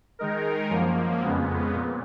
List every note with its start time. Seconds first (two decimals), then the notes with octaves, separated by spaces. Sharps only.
0.19 D#3 G#3 D#4 A#4
0.70 F#2 F3 A#3
1.22 F2 C#3 G#3 B3
1.74 A#2